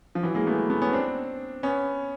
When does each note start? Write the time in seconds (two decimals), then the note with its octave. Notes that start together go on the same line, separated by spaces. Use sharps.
0.15 F3
0.23 E3 F#3
0.35 G#3 A#3
0.47 A3 B3
0.70 A3 B3
0.82 B3 C#4
0.93 C4 D4
1.63 B3 C#4